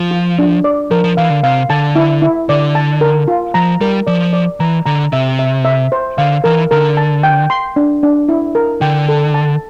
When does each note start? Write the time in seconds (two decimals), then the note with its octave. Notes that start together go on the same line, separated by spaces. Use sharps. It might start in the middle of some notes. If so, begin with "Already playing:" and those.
Already playing: F3
0.11 F4
0.39 D4
0.64 D5
0.91 F3 A#4
1.04 F3
1.17 E3 F5
1.30 D3
1.43 C3 F5
1.70 D3 A5
1.96 E4
2.22 E4
2.49 D3 D5
2.75 A5
3.01 A#4
3.28 F4
3.54 F3 A#5
3.81 G3 A#4
4.07 F3 D5
4.33 D5
4.60 E3 A#5
4.86 D3 A#5
5.12 C3 E5
5.39 E5
5.65 E5
5.92 C5
6.18 D3 F5
6.44 E3 A#4
6.71 D3 A#4
6.97 A5
7.23 G5
7.50 C6
7.76 D4
8.03 D4
8.29 E4
8.55 A#4
8.81 D3 G5
9.09 A4
9.34 A5